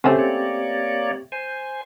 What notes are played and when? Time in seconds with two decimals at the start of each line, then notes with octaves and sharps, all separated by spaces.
0.04 C#3 A3 C4 C#4 G4 C5
0.19 A#3 C#5 D5
1.32 C5 G#5